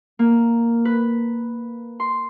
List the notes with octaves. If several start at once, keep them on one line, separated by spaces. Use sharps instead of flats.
A#3
B4
C6